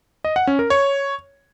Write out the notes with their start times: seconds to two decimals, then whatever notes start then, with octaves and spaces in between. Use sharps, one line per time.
0.25 D#5
0.36 F#5
0.47 C#4
0.59 A#4
0.70 C#5